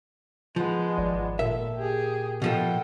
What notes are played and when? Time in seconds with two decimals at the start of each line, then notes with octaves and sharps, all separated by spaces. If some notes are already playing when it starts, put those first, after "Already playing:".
0.56 F3 G#3 B3
0.98 G#1 D5
1.39 A#2 A4 A#4 E5
1.76 G4 G#4
2.42 B2 F3 A4 F#5 G5